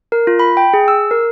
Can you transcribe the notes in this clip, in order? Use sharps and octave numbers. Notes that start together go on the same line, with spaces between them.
A#4
F4
B5
G5
G#4
E6
A#4